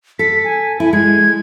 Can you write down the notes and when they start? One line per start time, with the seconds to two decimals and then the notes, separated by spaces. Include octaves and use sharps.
0.19 A4 B6
0.44 G#5
0.80 E4 G#5
0.93 G#3 G#6